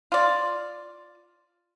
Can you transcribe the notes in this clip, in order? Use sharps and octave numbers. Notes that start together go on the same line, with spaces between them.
F4 D5